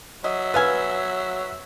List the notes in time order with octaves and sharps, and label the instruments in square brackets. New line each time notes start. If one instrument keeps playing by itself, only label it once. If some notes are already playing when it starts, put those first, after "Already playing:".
[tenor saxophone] F#3 [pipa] D#5 [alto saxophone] E5
[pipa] B3 F5 G#5 [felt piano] B4 E6